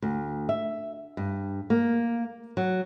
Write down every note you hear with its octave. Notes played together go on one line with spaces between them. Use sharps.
D2
E5
G2
A#3
F#3